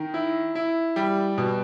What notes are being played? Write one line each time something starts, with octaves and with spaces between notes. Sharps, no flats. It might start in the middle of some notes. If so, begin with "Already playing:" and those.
Already playing: D#3
E4
E4
G3
B2